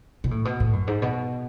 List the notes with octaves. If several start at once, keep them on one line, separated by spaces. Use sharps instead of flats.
B2
A2
B2
A2
F#2
G#2
B2